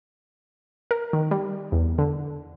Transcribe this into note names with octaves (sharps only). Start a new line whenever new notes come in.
A#4
D#3
G3
E2
D3